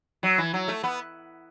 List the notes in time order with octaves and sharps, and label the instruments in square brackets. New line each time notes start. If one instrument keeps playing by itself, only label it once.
[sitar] F#3
E3
F#3
A3
B3